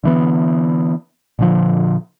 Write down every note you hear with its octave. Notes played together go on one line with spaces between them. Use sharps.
D3 E3 B3
A#2 D3 F3